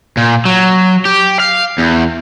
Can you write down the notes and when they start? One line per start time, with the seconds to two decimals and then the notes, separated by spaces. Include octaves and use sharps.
0.17 A#2
0.46 F#3
1.05 G4
1.40 F5
1.78 E2